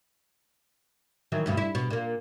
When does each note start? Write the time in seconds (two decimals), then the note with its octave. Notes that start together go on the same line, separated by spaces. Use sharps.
1.32 D#3 E3 F#3
1.46 D2 G2 B2
1.57 E4
1.75 B2
1.90 A#2 A#3